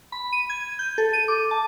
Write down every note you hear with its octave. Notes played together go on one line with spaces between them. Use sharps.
B5
D#7
G#6
G6
A4
D#7
D6
A5